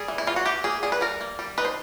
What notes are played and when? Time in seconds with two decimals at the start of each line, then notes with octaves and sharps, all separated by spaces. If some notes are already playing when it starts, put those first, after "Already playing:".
Already playing: G3 G#4
0.08 E3
0.18 E4
0.27 E3 F4
0.36 F#4
0.46 E3 G4
0.64 A#3 G#4
0.83 G3 G#4
0.92 B4
1.01 G3 A#4
1.21 A#3
1.39 G3
1.58 D#4 B4
1.65 C5